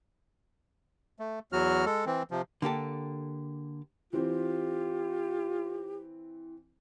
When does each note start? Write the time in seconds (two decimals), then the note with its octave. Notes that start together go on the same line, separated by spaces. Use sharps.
1.19 A3
1.52 E2 F#3 F#4 F6
1.85 G#3 A4
2.06 E3 C4
2.31 C3 F3
2.62 D3 A#3 G4 A4
4.13 E3 C4 F4 G4